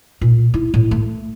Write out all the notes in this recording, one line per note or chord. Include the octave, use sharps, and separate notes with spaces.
A#2
E4
A2
A3